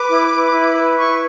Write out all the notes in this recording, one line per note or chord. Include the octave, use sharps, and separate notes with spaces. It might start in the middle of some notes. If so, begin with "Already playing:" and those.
Already playing: B4 D6
E4
B4
E4
B4
E4 C#6